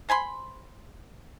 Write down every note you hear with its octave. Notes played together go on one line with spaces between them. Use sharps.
C5 G#5 B5 C6